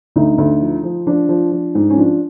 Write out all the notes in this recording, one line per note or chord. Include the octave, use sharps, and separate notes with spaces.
D2 D#4
D2
F3
F3
F3 D4
F3
F3
G#2
C#4
F3 D4